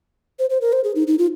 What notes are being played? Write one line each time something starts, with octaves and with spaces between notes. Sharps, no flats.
C5
C5
A#4
C5
G#4
D#4
D#4
F4